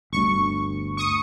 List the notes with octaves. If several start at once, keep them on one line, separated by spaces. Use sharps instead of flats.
G1 D2 C#6
C#6 D#6 C#7